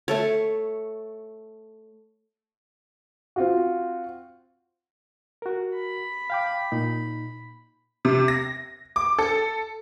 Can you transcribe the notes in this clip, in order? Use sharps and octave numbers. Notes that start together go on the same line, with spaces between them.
A3 A4 C#5
C4 F4 F#4
F#4 A#4
B5
F5 G5 D6
A#2 D#4
C3
A#6
D6
A4